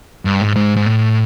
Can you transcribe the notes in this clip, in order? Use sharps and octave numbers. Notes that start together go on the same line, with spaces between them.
G2
G#2
G#2
G#2
A2